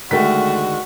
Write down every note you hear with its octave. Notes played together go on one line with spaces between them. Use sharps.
D3 D#3 G#3 A3 F#4 B6